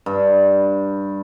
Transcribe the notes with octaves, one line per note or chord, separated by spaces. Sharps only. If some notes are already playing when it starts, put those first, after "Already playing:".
G2